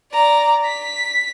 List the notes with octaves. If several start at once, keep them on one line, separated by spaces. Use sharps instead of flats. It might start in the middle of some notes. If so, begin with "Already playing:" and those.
D5 A#5
B6